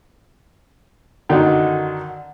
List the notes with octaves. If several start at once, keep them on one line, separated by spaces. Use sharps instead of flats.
F#2 D3 D#3